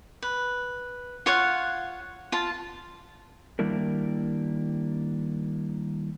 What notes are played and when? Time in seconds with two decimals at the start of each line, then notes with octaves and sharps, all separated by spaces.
0.22 B4
1.26 F4 C#5 F5 F#5
2.32 F4 A5
3.59 D#3 G3 A#3 D4 E4 A#4